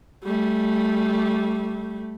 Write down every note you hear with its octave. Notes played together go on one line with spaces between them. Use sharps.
G3 A3